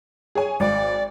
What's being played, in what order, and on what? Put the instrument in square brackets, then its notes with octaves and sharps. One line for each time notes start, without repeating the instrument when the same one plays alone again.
[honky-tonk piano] G#4 C#5 G#5
[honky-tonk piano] G#1 [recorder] D5